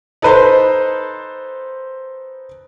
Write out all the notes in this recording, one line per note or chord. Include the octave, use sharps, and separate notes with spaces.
D#4 A4 B4 C5